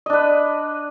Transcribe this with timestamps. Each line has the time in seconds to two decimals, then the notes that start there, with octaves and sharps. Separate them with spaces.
0.06 D#5
0.10 D4
0.13 B4